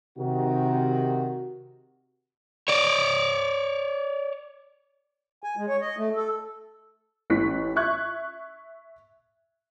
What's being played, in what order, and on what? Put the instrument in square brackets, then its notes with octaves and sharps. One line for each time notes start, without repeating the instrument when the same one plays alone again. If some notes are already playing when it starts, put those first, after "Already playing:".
[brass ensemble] C3 D#3 F#4
[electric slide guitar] C#5 D5
[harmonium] G#5
G#3
C#5
D#5
A3
A4
[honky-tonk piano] A1 A2 C#4 C#6 F#6 B6
E5 C#6 F#6 G#6